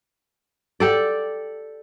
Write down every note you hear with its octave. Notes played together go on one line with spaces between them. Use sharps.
G4 A4 D5